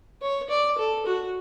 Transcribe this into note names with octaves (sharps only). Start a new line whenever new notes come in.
C#5
D5
A4
F#4